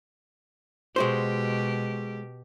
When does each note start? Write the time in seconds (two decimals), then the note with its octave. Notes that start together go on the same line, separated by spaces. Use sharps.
0.96 B2 G#3 F#4 G4 C5